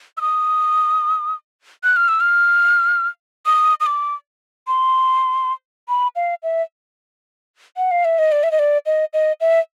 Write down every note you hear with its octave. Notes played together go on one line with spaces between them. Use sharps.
E6
D#6
F#6
F6
E6
F6
D#6
D#6
D6
C6
B5
F5
E5
F#5
F5
E5
D#5
D5
E5
D#5
D5
D#5
D#5
E5